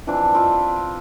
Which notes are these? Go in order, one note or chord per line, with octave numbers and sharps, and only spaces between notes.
E3 F3 C4 D4
C4 F4 D5 E5